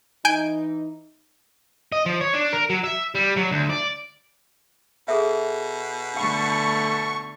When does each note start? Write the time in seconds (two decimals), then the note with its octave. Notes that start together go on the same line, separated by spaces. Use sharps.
0.25 E3 D#4 G#5 G6 D7
1.92 D#5
2.06 F3
2.21 C#5
2.34 D4
2.53 A#4
2.70 F#3
2.84 E5
3.15 G3
3.37 F#3
3.52 D2
3.70 D5
5.08 B2 G#4 A4 E5
6.17 D3 A3 F#5 B5 C#6